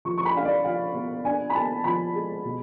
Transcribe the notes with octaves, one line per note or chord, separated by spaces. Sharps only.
F3 C#6
C#6
B5
D4 F5
D5
F3 F5
B3
D4 G#5
B5
B3 A5
F3 B5
G#3
B2